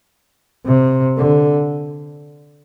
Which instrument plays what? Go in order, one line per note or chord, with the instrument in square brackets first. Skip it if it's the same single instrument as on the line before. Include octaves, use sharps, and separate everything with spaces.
[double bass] C3
D3